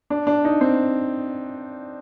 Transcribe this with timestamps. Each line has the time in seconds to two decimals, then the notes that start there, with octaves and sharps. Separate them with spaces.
0.10 D4
0.27 D4
0.45 D#4
0.61 C4